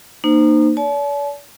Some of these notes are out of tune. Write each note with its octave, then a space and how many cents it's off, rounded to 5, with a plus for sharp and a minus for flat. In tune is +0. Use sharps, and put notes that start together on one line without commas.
A#3 +0 D#4 -35 C5 -20
D5 -45 A5 -40